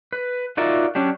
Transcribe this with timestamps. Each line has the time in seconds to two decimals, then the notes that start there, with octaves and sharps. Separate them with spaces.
0.13 B4
0.57 D#4 F4 F#4 A#4 D5 E5
0.95 F#3 C#4 D4 G4